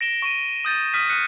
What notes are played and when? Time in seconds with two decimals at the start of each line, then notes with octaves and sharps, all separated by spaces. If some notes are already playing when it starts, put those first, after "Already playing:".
0.01 A#6 D7 E7 G7
0.22 C#6 D#7
0.65 D#6 G6 A6 D#7
0.93 D#6 F6 B6 D#7
1.09 F6 F#6 C#7 D#7